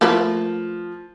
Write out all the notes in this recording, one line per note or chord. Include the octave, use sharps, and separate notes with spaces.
F3 A3 A#3 B4